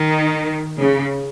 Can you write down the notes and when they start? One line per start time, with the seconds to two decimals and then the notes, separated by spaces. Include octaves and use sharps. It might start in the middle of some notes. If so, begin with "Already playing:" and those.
Already playing: D#3
0.79 C#3